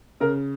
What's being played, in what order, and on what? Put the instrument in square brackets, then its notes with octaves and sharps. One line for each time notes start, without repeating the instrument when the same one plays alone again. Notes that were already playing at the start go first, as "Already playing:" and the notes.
[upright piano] C#3 A#4